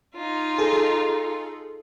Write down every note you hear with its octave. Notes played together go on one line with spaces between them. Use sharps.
D#4 F4
G#4 A4